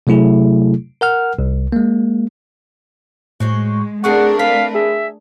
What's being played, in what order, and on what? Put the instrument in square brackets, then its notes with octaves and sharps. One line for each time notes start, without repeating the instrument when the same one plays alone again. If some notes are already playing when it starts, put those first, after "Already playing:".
[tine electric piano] C3 F#3 A3 E4 G#4
A#4 F#5 F6
C2
G#3 A#3
[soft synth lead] A2 [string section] G#3 [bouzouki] F#4 C5 C#5
[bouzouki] C#3 C4 G#4 [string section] A3 D4 A#4 [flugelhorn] F#5 [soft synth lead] C#6
[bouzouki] C4 B4 [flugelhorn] F5 [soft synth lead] B6
[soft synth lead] G#4 [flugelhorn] E5